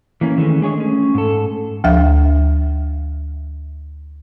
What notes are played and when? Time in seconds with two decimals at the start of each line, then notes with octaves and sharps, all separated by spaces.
0.21 E3 A#3 C#4
0.38 D#3 E3 G#3 A3 C#4
0.61 G#3 D4 G#4 C#5 D#5
0.78 A3 C#4
1.15 G#2 A4
1.84 D2 F3 E5